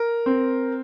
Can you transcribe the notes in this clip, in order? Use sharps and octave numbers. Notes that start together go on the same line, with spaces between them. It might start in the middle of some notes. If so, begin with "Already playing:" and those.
Already playing: A#4
C4